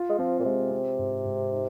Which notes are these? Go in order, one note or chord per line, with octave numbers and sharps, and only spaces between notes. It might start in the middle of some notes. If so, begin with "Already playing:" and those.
Already playing: F4
G#3
F3 C4
A#2
C3 G#3
C4
G#2
G#2
D#4